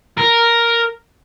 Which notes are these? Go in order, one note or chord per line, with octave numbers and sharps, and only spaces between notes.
A#4